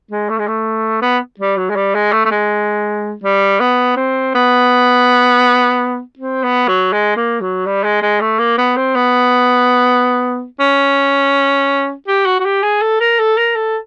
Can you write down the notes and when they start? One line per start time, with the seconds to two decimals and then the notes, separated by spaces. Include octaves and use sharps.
0.11 G#3
0.29 A3
0.39 G#3
0.48 A3
1.02 B3
1.39 G3
1.57 F#3
1.70 G#3
1.75 G3
1.95 G#3
2.12 A3
2.25 A3
2.31 G#3
3.24 G3
3.60 B3
3.97 C4
4.35 B3
6.19 C4
6.43 B3
6.68 F#3
6.92 G#3
7.16 A#3
7.41 F#3
7.66 G3
7.83 G#3
8.02 G#3
8.21 A3
8.39 A#3
8.58 B3
8.76 C4
8.95 B3
10.60 C#4
12.07 G4
12.26 F#4
12.39 F#4
12.45 G4
12.62 G#4
12.81 A4
13.00 A#4
13.19 A4
13.37 A#4
13.55 A4